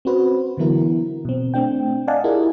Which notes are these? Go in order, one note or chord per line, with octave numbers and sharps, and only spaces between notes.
C4 C#4 F#4 B4 C5
D3 E3 F#3 B3 E4 A#4
B2 C4
A3 C4 D4 G5
D5 D#5 F5 F#5 G#5 A5
E4 F4 G4 G#4 A#4